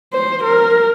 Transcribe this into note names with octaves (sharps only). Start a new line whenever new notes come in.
C5
A#4